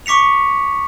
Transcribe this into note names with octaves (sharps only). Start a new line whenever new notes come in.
C#6 D6 B6 C#7 F7